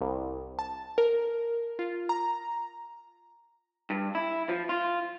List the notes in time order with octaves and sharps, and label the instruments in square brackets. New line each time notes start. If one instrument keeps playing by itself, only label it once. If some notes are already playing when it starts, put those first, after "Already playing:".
[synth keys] C2
A5
A#4
F4
A#5
[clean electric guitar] G2
E4
F3
F4